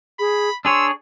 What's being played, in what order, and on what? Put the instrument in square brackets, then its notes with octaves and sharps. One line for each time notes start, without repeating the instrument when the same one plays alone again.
[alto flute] G#4 [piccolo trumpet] B5
[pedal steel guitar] D4 G#4 C#5 [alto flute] C6 [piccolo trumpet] E6